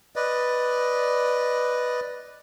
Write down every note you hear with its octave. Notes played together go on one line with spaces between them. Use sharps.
B4 D5 D#5